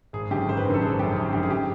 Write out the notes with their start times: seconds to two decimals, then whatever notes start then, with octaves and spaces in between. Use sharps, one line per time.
0.13 G#1 G#4
0.31 F#2 D3 G4
0.48 G#1 C5
0.57 B4
0.65 F#2 A#4
0.70 D3 A4
0.82 G#1 G#4
0.99 F#2 D3 G4
1.16 G#1 G#4
1.33 F#2 D3 G4
1.43 G#4
1.50 G4